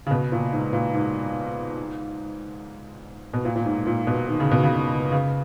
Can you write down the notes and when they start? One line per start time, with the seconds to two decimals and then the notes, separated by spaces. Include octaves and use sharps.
0.06 C#3
0.11 B2
0.32 A#2
0.53 G#2
0.73 A#2
0.94 G#2
3.34 B2
3.45 A#2
3.56 A#2
3.66 G#2
3.86 A#2
4.07 B2
4.28 D#3
4.40 C#3
4.52 B2
4.63 C#3
5.12 C#3